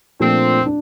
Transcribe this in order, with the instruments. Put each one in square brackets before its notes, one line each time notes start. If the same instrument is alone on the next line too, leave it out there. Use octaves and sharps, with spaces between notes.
[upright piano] A#2 F3 A3 D4 [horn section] C4
[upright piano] D4